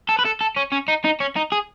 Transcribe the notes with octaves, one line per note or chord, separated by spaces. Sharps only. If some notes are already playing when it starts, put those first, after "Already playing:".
A4
B4
A4
A4
C#4
C#4
D#4
D#4
C#4
D#4
G#4